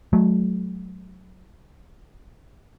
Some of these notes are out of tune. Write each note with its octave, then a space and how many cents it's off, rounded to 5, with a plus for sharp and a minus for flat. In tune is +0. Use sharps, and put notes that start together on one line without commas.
F#3 -5 A3 -35